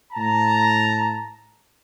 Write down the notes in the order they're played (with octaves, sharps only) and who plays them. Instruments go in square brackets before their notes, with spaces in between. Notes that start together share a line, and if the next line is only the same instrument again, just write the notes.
[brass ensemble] A2 A5 A#5